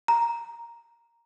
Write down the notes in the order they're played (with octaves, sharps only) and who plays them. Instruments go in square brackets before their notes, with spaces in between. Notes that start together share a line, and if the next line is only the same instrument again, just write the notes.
[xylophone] A#5